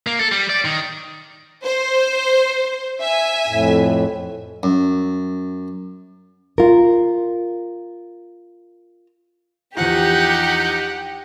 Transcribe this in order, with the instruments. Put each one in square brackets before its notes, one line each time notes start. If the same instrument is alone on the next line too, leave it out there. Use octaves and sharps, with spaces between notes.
[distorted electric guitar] A#3
A4
G3
D5
D#3
[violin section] C5
E5 G#5
[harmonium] F2 A2
[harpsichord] F#2
[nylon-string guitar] F4 A#4
[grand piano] E2 F3 [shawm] D#4 [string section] G4 [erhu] F#5